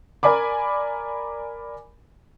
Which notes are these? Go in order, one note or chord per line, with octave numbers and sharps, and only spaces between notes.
A#4 D5 G#5 B5 D6